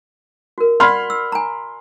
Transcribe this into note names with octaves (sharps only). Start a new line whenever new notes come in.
F#4 A#4
D5 F#5 B5 C6 F6
E6
G#5 A#5